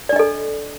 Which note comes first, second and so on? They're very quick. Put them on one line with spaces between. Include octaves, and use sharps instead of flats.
D5 D4 D#5 A4